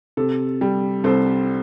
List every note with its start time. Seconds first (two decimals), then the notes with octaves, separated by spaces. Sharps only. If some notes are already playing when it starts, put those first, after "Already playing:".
0.17 C3 A4
0.61 G3
1.04 C2 A4 C5